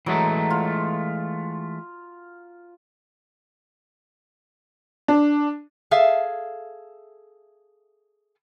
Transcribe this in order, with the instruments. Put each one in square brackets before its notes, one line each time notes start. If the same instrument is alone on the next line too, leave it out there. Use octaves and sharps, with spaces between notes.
[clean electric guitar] E3 G#3 A3 [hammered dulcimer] F#3
[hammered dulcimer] F4
[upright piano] D4
[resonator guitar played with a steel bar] G#4 A4 E5 F5